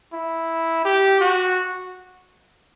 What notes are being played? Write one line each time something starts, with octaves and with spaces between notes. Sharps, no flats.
E4
G4
F#4